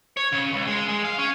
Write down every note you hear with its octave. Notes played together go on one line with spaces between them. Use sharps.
C#5
C#3
C#2
G#3
G#3
F5
C#4